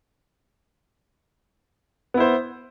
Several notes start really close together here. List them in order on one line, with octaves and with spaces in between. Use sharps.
B3 E4 C5